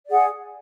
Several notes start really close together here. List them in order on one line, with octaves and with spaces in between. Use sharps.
D5 G#4 F#5